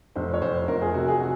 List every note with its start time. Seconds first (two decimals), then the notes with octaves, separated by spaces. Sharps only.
0.16 F1 C5
0.33 C#5
0.42 F1 C5
0.68 F1 A#4
0.82 G#4
0.94 C3 F#4
1.08 G#4
1.20 F#4